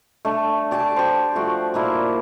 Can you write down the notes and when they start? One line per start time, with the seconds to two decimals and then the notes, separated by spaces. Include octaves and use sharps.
0.25 A3 D4
0.71 G4 D5 G#5 A5
0.96 G4 C5
1.35 F3 A3 F#4
1.74 A#2 A#3 E4